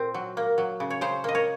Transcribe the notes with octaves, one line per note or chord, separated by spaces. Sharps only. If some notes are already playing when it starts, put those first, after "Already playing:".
Already playing: A#2 C4 A#4
F#3
A#3
F#3
C#3
C#5
C#3 C5
A#3 D#5
C#5